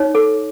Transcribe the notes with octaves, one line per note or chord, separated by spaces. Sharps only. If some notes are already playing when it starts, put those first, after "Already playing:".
Already playing: D#4 C#5
A4